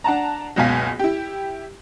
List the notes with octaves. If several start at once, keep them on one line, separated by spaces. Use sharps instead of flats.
D4 F#5 A5 A#5
F#1 C#2 B2 F5 G#5 B6
E4 G4